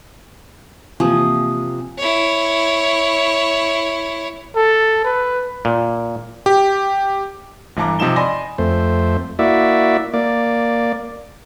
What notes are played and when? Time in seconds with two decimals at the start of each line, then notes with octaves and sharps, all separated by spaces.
1.00 C3 E3 F3 A#3 G#5 D#6
1.99 E4 C#5
4.56 A4
5.04 B4
5.65 A#2
6.46 G4
7.77 G1 E3 A5 A#5 D6
7.99 C3 F3 D#4 E7 G7
8.16 D5 D#5 G#5 B5 C6 A#6
8.58 F2 A3 C5
9.39 A#3 E4 F#4 D5 E5
10.14 A#3 D5